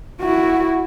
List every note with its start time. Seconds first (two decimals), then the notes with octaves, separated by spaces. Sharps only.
0.21 E4 F#4